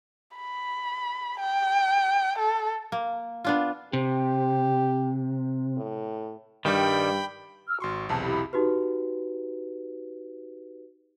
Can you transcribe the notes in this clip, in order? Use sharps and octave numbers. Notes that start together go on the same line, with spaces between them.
B5
G5
A4
A#3
B3 D4 F4
C3 G4
A2
G2 D#3 G3 G5 B5
E6 F6
G#1 F#4 C6 C#6
B1 E2 C3 G#4 A5
E4 G4 B5
D#4 F#4 G4 B4